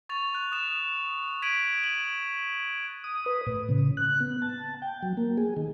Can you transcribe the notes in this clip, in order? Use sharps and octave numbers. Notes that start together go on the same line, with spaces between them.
C#6 A6 F7
F#6
D#6 A6 E7
G#6 B6 D7 D#7 F#7
F#7
D#6
B4
A2
C#3
F#6
B3
A5
G5
F#3
A#3
G#4
D#3